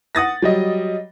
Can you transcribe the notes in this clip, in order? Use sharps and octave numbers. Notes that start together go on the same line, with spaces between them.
F#5 D#6 A6 A#6
F#3 G3 D#5